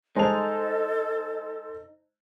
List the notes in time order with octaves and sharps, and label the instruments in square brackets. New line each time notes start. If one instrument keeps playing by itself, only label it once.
[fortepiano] G#3 [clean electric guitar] D#4 [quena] A4 [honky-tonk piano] C5 A5 F7